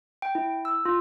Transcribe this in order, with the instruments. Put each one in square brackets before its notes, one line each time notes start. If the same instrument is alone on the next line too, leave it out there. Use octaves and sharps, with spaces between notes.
[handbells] G5
E4
E6
F4